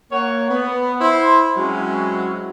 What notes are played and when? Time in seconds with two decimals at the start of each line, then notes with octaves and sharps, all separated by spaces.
0.12 A#3 C#5 F#5
0.49 B3
1.00 E4 C5 C6
1.57 F#3 G#3 C4 C#4 E4 F#4